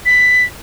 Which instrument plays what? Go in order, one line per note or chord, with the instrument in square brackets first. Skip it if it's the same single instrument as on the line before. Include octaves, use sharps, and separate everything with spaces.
[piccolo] B6